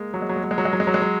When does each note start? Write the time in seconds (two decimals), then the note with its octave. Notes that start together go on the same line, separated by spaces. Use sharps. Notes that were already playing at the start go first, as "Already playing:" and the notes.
Already playing: G#3 A#3
0.14 F#3
0.22 G#3
0.29 F#3
0.36 G#3
0.44 F#3
0.51 G#3
0.58 F#3
0.65 G#3
0.73 F#3
0.80 G#3
0.87 F#3
0.94 G#3
1.02 F#3